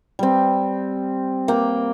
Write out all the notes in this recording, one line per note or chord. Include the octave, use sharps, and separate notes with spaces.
G3 C4
A#3 G5